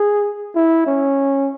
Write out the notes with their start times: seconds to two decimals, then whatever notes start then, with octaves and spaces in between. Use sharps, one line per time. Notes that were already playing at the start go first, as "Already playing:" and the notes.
Already playing: G#4
0.56 E4
0.87 C#4